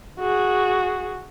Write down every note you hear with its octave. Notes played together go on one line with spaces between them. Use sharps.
F#4 G#4